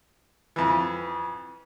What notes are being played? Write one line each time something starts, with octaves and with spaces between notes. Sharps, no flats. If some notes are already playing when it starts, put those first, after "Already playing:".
F2 E3